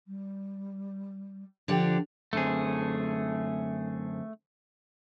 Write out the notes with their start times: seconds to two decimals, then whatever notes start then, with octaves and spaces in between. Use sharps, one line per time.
0.07 G3
1.68 D3 F3 D4 G4
2.33 F#2 D3 A3 C4 G#4